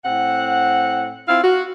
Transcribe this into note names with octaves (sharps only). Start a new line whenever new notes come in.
A2 C4 F#5
C4 E4 F4 F5
F#4